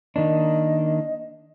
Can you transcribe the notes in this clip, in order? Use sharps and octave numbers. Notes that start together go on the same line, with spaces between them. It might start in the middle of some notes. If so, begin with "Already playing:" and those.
D#3 A#3 D4 D#5